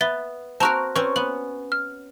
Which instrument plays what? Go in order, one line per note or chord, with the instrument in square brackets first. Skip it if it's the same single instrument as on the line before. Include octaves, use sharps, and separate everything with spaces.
[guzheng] B3 [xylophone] E5 A6 G7
[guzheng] C4 F#4 A#4 [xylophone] A5 A#5 C#6
[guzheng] C4 C#4 [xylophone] B4 C#6
[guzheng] B3 [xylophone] F#7
[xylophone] F6